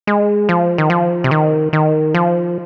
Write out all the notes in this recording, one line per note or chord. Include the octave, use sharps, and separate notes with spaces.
G#3
F3
D#3
F3
C3
D#3
D#3
F3